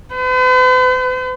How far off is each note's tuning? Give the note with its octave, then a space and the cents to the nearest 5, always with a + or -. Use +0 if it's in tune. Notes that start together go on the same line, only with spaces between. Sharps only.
B4 +45